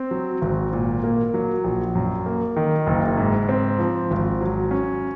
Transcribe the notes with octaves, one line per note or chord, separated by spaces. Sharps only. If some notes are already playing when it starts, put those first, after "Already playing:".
Already playing: C4
F#3
G#1
A#2
A#3
F#3
A#1
F#2
A#3
D#3
F#1
G#2
C4
F3
G#1
F#3
C#4